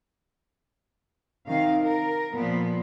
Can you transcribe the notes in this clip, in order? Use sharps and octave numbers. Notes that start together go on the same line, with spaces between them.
C3 D#3 F5
A#4
A#2 F3 B3